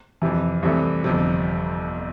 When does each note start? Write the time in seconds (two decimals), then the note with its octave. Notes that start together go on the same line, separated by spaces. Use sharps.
0.22 F2 C3 E3
0.63 C2 C3 E3 A3
1.04 G1 F2 C3